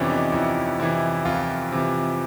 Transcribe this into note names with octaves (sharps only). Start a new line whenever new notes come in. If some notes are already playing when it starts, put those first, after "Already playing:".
Already playing: F2 C3 E3 B3 C#4 D4
D#4
F2 E4
C3 E3 E4
F2 F4
C3 E3